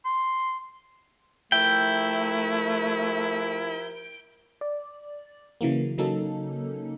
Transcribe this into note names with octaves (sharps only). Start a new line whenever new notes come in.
C6
F3 A3 E4 G4 A#4 G5
D5
C#3 E3 F#3 A#3
C#3 F#3 A#3 C#4 D#4 A4